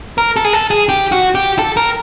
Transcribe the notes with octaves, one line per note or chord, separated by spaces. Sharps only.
A#4
A4
G#4
A4
G#4
G4
F#4
G4
A4
A#4